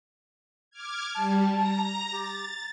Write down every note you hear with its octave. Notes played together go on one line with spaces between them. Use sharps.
D6 F6 G#6
G3 A5
A#5 A#6
G4 A6